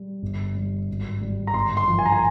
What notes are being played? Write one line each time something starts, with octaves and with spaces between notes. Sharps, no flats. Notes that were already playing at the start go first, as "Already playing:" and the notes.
Already playing: G3
G1
G3
G#1
G3
A#5
G1 C6
C6
F3
G#5
A#5
G#5